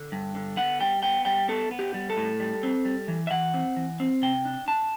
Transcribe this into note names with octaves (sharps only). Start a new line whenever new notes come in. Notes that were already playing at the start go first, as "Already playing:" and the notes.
Already playing: D3
G2
D3
B3 F#5
G3 G5
B3 G5
G3 G5
B3 A4
B3
G4
G3
A4
A2
G3
C4
G3
E3
E5
E3 F#5
C4
E3
C4
C3 G5
D4
D4 A5